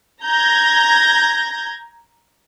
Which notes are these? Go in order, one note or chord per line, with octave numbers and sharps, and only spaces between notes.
A#5 G6 G#6 A#6